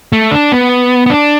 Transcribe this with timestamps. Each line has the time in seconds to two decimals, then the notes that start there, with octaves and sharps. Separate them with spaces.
0.13 A3
0.31 D4
0.52 B3
1.06 B3
1.10 D4